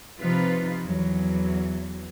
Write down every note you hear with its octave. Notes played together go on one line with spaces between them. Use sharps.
C3 F3 D#4 F4 B4
E2 E3 F#3